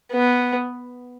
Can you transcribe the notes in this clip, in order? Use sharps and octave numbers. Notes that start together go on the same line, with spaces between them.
B3